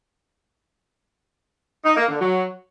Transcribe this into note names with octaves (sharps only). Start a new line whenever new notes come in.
D#4
A#3
D3
F#3